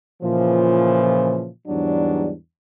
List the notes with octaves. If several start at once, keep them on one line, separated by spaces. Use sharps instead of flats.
A#2 C#3 E3 F3
E2 G#2 F#3 G3 D4